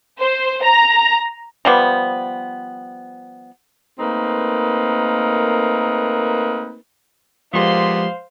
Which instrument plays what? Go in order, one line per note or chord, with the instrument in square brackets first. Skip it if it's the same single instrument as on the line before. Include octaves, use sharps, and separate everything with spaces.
[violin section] C5
A#5
[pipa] F3 G3 B3
[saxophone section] A3 A#3 C4 D#4 A#4 B4
[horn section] A#2 B3 C6 [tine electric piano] F3 G#3 G4 [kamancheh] C5 F5